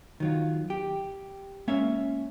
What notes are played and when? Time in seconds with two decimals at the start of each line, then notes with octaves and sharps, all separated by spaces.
0.20 D#3 F#3 F4
0.70 G4
1.68 G#3 A#3 C#4 C#5 E5